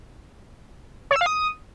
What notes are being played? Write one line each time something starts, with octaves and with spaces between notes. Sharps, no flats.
C#5
E6
F5
D#6